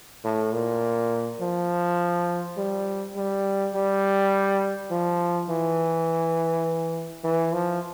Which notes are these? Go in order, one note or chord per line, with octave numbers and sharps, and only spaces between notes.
A2
A#2
F3
G3
G3
G3
F3
E3
E3
F3